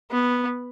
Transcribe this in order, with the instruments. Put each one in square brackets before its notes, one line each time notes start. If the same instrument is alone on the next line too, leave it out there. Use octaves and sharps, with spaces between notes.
[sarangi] B3